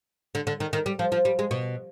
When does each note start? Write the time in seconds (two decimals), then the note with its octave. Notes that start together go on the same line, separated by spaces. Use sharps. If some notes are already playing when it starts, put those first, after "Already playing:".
0.35 D3
0.47 D3
0.60 D#3
0.73 D#3
0.86 G3
0.99 F3
1.12 F3
1.25 G3
1.39 G#3
1.51 B2